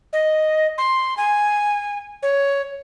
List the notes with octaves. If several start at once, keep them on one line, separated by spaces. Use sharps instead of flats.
D#5
C6
G#5
C#5